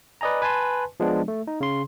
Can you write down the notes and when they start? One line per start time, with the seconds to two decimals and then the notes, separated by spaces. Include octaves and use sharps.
0.21 B4 D5 D#5 G#5 A#5
0.42 B4 G#5 A5 C6
1.00 F3 G#3 B3 D4
1.28 A3
1.47 D#4
1.61 C#3 C6